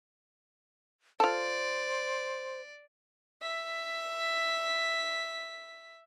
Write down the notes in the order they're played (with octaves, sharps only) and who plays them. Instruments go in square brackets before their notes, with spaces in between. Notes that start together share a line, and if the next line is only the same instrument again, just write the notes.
[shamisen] F4 A4 [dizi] C5 [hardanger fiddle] D5
[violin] E5 B6